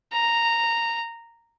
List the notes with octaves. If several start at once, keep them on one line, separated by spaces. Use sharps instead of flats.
A#5